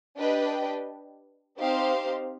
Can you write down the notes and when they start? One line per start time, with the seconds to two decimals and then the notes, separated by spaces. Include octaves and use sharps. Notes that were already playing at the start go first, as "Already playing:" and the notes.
0.17 D4 G4 B4 D#5 G5
1.58 C4 D#4 G4 C5 F5